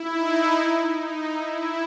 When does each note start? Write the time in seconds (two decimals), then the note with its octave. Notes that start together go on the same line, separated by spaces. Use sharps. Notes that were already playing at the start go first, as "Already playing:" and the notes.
Already playing: E4
0.14 D#4
0.93 D#4
1.32 E4